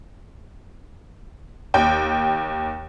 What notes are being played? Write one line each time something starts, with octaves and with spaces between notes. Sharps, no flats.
D#2 G5